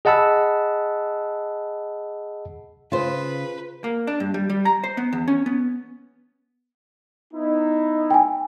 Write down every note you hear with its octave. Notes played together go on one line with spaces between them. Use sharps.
G#4 D#5 F#5 A5 B5 E6
C#3 F4 B4 C5
A#3
D4
G2
G3
G3
A#5
C5
B3
E2
C#4
B3
B3 D#4 E4
G5 G#5